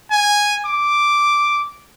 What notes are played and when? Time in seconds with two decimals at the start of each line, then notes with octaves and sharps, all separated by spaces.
0.11 G#5
0.66 D6